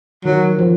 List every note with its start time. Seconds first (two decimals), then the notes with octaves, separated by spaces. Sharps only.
0.25 D#3 F#3
0.58 F3